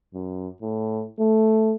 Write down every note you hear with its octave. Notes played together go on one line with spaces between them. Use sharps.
F#2
A2
A3